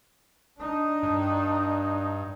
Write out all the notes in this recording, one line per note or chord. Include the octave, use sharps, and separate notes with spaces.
D4 D#4
G2